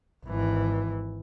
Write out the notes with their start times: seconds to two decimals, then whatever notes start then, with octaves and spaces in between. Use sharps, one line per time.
0.25 G#1 E3